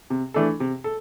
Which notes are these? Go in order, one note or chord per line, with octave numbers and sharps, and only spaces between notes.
C3
E3 A3 D4 A4
C3
A4